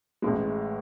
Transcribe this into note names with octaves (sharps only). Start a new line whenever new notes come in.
A1 A2 G#3